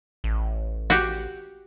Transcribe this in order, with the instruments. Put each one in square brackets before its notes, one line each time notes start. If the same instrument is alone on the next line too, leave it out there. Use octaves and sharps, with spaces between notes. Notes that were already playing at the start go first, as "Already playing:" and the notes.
[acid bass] A1
[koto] F#4 G4